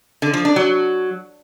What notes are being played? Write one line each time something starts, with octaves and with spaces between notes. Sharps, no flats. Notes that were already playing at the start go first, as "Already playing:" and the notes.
D3
F3
D4
F#3